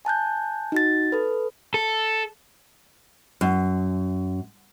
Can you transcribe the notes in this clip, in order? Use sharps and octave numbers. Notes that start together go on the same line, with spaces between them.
G#5 A5 F#6 G6
D#4 F#4 A6
A4 B4
A4
F#2